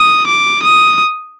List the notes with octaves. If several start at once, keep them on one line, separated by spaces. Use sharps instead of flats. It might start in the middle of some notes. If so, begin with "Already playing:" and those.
Already playing: D#6
D6
D#6